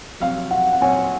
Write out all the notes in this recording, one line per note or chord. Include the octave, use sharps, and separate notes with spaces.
F2 C3 F#3 F5
F#5
F#5
A#2 F#3 C4 F#4 C#5 G#5